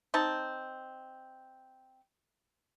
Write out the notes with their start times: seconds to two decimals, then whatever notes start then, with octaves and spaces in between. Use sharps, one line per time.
0.14 C4 D#4 A5